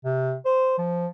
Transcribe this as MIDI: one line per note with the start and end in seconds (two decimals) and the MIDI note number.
0.04 0.35 48
0.45 0.73 72
0.78 1.07 53